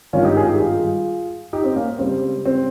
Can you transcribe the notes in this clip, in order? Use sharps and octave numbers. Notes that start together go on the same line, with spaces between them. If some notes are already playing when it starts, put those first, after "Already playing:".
G#1 G2 D#3 C#4 F4
D#4 G4
F4 G#4
D#4 G4
F4 G#4
D#4 G4
C4 D#4
A#3 C#4
C#2 C#3 G3 C4
C4